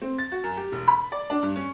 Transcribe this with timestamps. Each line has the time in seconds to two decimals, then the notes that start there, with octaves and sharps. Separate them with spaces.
0.02 C4
0.18 A6
0.32 F#4
0.44 F#2
0.57 G4
0.72 E1
0.88 B5
1.12 D5
1.30 D4
1.43 G2
1.56 C#4